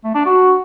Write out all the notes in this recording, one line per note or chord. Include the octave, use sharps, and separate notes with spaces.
A3
D4
F#4